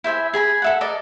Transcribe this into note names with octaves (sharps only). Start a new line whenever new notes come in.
E4 C5 E5 G#5
G#4 G#5 A#5 B5
A4 E5 F#5
A#4 D5 D#5 A5